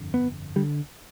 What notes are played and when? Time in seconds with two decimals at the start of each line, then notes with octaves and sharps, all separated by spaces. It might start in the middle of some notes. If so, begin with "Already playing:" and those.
Already playing: G1 F2 D3
0.14 B3
0.56 D3 G3